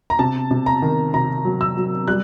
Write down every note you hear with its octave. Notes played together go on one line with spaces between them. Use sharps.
A#5
C3 A5
C3
A#5
D#3
C3 A#5
F#3
E6
F#3
G3 F#6